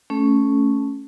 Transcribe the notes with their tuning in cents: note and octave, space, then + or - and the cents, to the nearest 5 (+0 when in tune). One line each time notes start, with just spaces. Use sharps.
A3 +0 C#4 +0 A4 -25